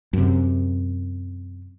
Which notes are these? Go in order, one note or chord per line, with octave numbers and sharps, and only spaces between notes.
F#2 C3